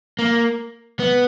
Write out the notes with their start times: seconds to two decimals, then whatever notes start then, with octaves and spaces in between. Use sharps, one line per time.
0.19 A#3
1.00 B3